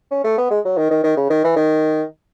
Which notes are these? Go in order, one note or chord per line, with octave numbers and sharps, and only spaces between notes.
C#4
A3
B3
G#3
F#3
D#3
D#3
D#3
C#3
D#3
E3
D#3